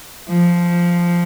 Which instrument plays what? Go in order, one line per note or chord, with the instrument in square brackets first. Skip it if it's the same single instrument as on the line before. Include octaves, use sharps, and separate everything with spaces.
[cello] F3